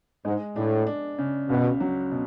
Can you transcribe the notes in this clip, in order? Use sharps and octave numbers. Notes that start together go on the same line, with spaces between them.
G#2 G#3
A2 D4
D4
C#3
C#2 B2
F#3
B2